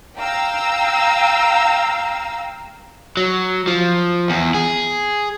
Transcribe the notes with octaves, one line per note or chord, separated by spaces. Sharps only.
F5 G5 A#5 E6
F#3
F3
E2
G#4